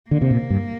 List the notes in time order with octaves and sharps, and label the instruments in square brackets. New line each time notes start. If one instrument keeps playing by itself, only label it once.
[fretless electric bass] D3 [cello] A#3
[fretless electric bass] C3
A#2
G2